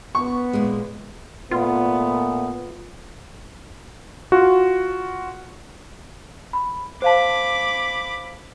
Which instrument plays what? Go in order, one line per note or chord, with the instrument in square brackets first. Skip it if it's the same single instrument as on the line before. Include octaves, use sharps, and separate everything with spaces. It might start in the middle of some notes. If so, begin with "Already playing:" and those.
[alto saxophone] B3 [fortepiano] C#6
[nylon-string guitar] A#2 G#3
[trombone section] A#2 A3 B3 [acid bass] F4
[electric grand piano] F4 F#4
[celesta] B5
[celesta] C5 F5 A5 [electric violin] B5 D6